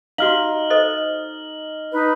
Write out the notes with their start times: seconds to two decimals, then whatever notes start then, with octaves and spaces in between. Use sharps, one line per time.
0.18 D#4 F#4 F5 F6 F#7
0.70 A4 C5 D#5
1.92 D#4 B4